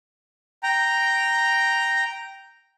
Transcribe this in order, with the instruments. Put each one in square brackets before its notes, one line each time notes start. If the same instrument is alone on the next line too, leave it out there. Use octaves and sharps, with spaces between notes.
[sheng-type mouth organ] G5 A#5